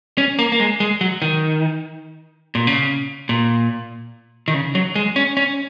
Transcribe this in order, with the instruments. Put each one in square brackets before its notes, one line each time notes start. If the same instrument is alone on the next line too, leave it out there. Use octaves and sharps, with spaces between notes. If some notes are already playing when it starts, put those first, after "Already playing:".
[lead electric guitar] C#4
A#3
A#3
G#3
G#3
F#3
D#3
A#2
C#3
A#2
D#3
C#3
F#3
G#3
C#4
C#4